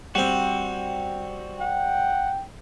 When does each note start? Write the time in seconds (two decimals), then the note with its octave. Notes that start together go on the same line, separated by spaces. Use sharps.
0.15 G3 C4 F#4
1.61 F#5 G5